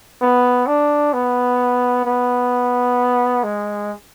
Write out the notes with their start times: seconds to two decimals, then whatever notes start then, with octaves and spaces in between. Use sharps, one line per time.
0.21 B3
0.67 D4
1.13 B3
2.05 B3
3.44 G#3